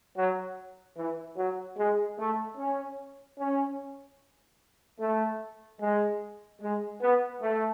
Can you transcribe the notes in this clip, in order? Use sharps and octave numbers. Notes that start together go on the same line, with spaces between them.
F#3
E3
F#3
G#3
A3
C#4
C#4
A3
G#3
G#3
B3
A3